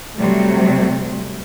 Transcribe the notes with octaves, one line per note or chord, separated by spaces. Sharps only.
C3 F#3 G3 A3